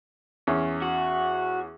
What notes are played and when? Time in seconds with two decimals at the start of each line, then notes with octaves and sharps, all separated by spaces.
0.47 E2 C#4
0.82 F#4